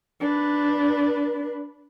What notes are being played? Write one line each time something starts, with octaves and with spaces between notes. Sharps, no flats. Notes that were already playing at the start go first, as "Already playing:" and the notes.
D4 B4